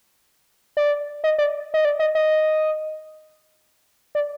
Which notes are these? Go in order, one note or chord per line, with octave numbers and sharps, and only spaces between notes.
D5
D#5
D5
D#5
D5
D#5
D#5
D5